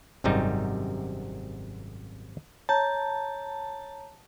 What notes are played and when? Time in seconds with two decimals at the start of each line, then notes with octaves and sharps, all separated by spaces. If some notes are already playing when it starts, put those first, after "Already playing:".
0.24 G#1 F#2 C3 G3 D#4
2.69 C#5 A5 A#5 G6